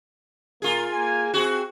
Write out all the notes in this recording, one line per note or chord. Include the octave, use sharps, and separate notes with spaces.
A#2 A#3 F4 G#4
A#3 G#5
C4 F#4 G#4